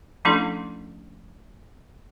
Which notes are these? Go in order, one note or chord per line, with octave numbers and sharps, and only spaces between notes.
F3 A3 C#4 D4 E4 A4